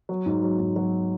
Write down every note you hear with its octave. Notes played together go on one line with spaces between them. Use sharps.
F#3
G#2
F#3
G#2
F#3